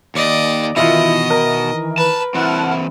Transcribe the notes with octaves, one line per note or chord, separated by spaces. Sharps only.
D#2 D5 D#5
B2 D#3 E3 E4 F4 D#5
A#4
B4 A5
E3 C4 E4 F#5 A5 F6